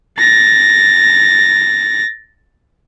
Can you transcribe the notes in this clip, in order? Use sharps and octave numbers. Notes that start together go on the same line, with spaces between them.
A6 A#6